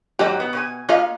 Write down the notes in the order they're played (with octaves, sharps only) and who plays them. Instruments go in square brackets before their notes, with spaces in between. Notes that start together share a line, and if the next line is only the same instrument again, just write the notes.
[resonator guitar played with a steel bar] G#2 F#3 G3 [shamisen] G4 D#5
[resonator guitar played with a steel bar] B3
B2 C#5 G#5
[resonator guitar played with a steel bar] A#3 [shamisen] F4 D#5 F5